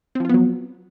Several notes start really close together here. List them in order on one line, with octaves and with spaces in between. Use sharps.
C4 F3 F4 B3 F#3